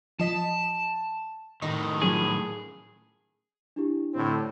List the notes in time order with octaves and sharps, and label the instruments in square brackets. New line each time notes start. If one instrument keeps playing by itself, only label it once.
[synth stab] F3 D#5 B6 [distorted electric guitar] A5
[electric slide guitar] A2 D#3 [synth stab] D#4
[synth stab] F3 F#3 C#4 [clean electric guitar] G#4
[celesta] D4 E4 G4
[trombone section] A2 D3 C4